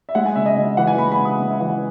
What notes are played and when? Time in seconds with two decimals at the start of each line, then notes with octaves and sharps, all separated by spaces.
0.09 E5
0.15 G#3 F#5
0.26 G#5
0.36 C#3 E5
0.46 D#5
0.56 C#3 D#5
0.77 E3 F#5
0.87 G#5
0.98 G#3 B5
1.12 B5
1.19 C#3
1.25 D#6
1.39 C#3
1.50 E5
1.60 E3 F#5